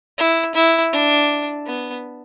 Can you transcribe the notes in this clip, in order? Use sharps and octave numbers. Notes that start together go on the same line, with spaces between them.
E4
E4
D4
B3